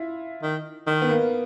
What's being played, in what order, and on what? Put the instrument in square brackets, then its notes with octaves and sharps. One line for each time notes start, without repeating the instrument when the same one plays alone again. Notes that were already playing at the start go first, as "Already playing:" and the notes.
Already playing: [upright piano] E4 F4
[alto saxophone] D#3
D#3
[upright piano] B3
A#3